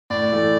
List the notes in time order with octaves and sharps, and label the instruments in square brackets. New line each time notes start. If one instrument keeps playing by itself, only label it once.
[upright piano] A2 [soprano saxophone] D5
[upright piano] E3 A3